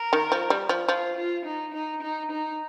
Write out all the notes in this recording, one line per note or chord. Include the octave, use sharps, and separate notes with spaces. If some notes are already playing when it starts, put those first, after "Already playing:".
Already playing: A#4
D#3
F3
G3
F3
F3 F4
F4
D#4
D#4
D#4
D#4